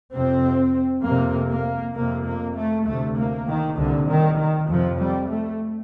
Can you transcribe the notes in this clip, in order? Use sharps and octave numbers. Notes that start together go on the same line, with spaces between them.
F2 C3 C4
F2 C3 A#3
A#3
F2 C3 A#3
A#3
A3
D2 C3 A3
A#3
D#3
C2 A#2 D3
D#3
D#3
F2 C3 F3
G3
A3